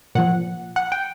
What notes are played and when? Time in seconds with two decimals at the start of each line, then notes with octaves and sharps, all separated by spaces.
0.15 A#2 F3 F#5
0.76 F#5
0.92 G5